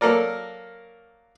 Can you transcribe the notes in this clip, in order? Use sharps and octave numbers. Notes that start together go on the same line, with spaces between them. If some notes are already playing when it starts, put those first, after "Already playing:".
F#3 A#3 A4 A#4 D5